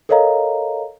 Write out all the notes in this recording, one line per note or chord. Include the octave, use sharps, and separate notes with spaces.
A4 A#4 C#5 D#5 F5 A#5